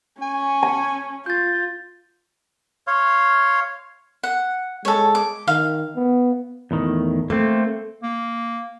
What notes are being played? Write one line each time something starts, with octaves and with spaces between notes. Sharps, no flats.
C#4 G#5
A5
F4 G6 A6
C#5 F5 C6
F#5
G#3 A4 C#5
D6
D#3 F5
B3
E2 A2 D#3
A3 A#3 C4
A#3